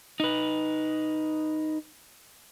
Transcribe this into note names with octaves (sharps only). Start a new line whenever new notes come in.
D#4 B4